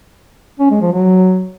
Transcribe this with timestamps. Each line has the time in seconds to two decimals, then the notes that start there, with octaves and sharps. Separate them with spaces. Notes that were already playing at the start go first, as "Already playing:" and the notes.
0.60 C#4
0.71 G#3
0.81 F3
0.92 F#3